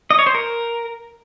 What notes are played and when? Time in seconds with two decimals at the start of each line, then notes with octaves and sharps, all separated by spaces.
0.11 D#5
0.19 C#5
0.26 C5
0.35 A#4